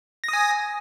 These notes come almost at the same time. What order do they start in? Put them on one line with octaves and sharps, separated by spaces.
A#6 D#6 G#5